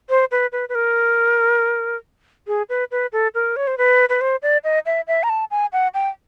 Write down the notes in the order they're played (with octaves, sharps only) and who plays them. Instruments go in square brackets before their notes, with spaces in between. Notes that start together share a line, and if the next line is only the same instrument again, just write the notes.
[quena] C5
B4
B4
B4
A#4
G#4
B4
B4
A4
A#4
C#5
C5
B4
B4
C5
D5
D#5
E5
E5
A#5
A5
G#5
F#5
G5